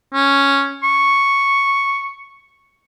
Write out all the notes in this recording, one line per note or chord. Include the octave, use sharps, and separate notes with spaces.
C#4
C#6